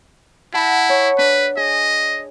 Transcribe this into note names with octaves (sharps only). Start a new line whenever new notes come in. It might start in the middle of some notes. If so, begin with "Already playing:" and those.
E4 F#5 A5 B5
C#5
D4 B4
G#4 D#5